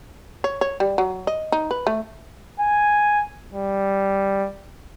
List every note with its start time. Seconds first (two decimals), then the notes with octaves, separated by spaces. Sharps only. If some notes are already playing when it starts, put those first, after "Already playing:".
0.44 C#5
0.61 C#5
0.80 G3
0.98 F#3
1.27 D#5
1.52 D#4
1.71 B4
1.87 A3
2.60 G#5
3.54 G3